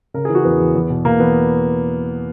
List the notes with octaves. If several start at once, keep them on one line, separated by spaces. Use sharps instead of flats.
C#3 A#4
E3 G#4
F#4
E2 B3
E2
E2
B2
B2 A#3
E2 B3